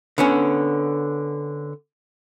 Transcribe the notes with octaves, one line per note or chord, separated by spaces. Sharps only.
D3 B3 C#4